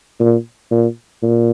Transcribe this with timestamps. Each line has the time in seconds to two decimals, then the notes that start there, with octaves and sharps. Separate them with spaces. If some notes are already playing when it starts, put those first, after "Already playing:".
0.20 A#2
0.71 A#2
1.23 A#2